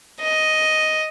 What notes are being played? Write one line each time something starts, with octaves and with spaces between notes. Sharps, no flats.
D#5